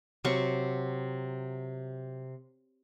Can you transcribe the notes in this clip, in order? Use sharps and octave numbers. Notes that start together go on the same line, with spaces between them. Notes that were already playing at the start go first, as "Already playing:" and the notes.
C3 F#3 C#6